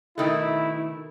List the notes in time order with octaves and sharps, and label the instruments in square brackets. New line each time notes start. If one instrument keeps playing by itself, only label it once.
[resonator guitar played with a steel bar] B2 D#3 A3 [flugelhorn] E4